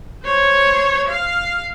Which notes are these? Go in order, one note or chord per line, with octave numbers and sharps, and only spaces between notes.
C5 C#5
F5